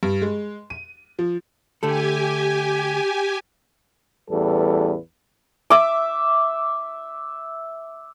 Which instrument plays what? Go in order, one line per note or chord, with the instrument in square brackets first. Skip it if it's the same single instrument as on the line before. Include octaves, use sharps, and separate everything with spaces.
[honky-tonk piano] G2
G#3
D#7
F3
[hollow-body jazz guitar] D3 A3 A4 [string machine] G4 G#5
[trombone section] A1 E2 G3 A4 B4
[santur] E5 D6